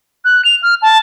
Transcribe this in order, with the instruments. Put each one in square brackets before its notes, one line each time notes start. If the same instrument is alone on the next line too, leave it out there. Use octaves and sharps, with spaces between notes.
[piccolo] F#6
F7
F6
A5